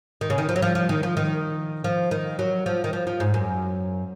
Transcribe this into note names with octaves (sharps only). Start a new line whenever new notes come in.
D#3
C#3
D#3
F3
F#3
F3
F3
D#3
F3
D#3
F3
D#3
F#3
F3
D#3
F3
F3
G#2
F#2